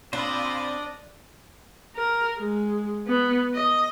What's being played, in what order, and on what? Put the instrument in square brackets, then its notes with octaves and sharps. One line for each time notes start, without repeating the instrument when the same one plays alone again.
[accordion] A#2 F4 B5 [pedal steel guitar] C4 C5 [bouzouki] D4 [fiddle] D5 D#5
[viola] A#4
G#3
B3
D#5